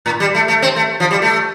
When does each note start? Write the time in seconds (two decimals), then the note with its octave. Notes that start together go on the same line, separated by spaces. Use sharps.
0.06 A2
0.20 G3
0.35 A3
0.48 A3
0.62 C4
0.76 A3
1.00 F3
1.11 G3
1.22 A3